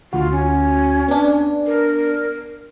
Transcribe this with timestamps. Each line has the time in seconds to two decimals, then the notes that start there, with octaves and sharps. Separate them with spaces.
0.13 D2 F4 F#4
0.32 C#4
1.08 B3 D4
1.67 A#4